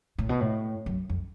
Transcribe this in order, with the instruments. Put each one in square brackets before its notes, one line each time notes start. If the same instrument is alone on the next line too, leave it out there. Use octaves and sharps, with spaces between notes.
[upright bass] A2
B2
A2
F#2
F2